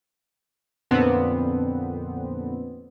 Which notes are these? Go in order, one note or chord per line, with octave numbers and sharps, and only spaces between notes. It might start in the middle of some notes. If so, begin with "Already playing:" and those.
F2 A#2 D3 B3 C4